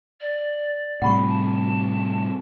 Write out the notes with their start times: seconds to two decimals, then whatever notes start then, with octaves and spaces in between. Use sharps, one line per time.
0.21 D5
1.02 A2 C3 G3 F#5 B5 C#6
1.28 A5